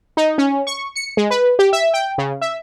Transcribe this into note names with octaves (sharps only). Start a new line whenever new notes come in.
D#4
C#4
C#6
C#7
G#3
B4
G4
E5
G5
C#3
E5